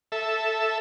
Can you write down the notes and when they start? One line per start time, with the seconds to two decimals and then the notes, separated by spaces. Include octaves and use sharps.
0.12 A4 E5